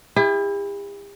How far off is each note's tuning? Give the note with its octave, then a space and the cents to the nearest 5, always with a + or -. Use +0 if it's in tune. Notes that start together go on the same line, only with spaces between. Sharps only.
E4 +0 G4 +45